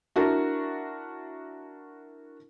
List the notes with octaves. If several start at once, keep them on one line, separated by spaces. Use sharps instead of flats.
D4 E4 F#4 A#4